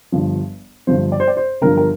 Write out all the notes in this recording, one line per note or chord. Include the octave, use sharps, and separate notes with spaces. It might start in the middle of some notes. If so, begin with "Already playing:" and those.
G1 G2 F3
G1 G2 F3 C5
D5
C5
D5
C5
G1 G2 D3 F3 A#4
A#4